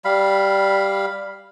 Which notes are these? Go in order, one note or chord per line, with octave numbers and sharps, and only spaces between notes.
G3 F5 B5